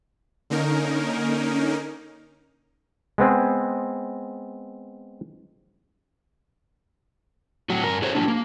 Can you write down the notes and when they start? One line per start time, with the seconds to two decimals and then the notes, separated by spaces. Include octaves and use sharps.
0.50 D3 A#3 C#4 D#4 A#4
3.18 G#3 B3 C4 G#4
7.70 A2 F#3 F#4
7.84 G2 B2 A#4
8.02 G#4 C5 C#5
8.15 F#3 A#3 D4
8.28 A#3